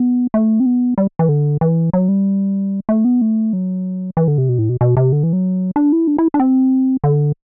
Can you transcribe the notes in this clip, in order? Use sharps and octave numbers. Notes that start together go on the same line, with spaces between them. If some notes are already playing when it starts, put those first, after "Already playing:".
Already playing: B3
A3
C4
B3
G3
E3
D3
E3
F#3
G3
A3
B3
A3
F#3
E3
D3
C3
B2
A2
B2
B2
C3
D3
E3
F#3
D4
E4
D4
E4
D4
C4
D3